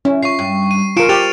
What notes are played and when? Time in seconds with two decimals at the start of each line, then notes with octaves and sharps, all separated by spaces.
0.05 C#4 E4
0.23 F4 C#6 C7
0.39 G2
0.71 D#7
0.97 E2 C#3 F4 A#4 C#7 D7 E7
1.09 G4 C5 F6 A6 F7